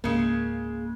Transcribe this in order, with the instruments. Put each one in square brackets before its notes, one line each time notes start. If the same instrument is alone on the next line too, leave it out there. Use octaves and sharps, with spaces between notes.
[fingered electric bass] C#2 G#2 [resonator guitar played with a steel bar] C#3 G#3 [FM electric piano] A#3